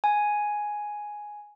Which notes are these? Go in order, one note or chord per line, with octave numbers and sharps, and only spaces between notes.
G#5